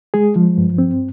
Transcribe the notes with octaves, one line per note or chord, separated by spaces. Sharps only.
G#3 G#4
F3
G2
C4